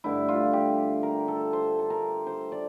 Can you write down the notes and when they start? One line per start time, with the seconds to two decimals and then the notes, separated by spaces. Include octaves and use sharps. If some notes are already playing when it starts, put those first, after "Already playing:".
0.04 G2 D3 A3 D4 E4
0.29 F4
0.53 G4
1.03 A#4
1.28 A4
1.53 C5
1.79 A4
1.90 A#4
2.27 C5
2.52 D5